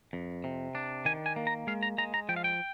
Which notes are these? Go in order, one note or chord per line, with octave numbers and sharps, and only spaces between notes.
F2
C3
D4
D#3 G#5
G#5
A#3
A#5
G#3 F5
A#5
G#3 A#5
A#5
F3 G5
F5
G5